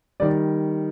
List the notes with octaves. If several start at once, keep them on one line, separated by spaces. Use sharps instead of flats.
D#3 G3 D5